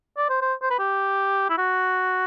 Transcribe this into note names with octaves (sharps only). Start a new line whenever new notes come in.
D5
C5
C5
C5
B4
G4
E4
F#4